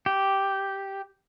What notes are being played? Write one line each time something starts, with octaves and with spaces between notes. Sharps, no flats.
G4